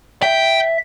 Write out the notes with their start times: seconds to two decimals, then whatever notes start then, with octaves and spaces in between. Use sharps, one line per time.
0.22 E5 G5